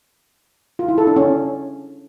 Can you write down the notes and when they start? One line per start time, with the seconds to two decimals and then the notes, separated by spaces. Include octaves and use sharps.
0.79 F4
0.88 E4
0.98 A4
1.07 D4
1.16 C#4